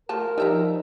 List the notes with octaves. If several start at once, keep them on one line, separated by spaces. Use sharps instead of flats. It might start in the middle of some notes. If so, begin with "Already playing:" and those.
F3 A3 A#4 A5
F3 G3 D#4 E5 A#5